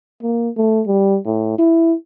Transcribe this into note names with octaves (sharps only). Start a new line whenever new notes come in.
A#3
A3
G3
A2
E4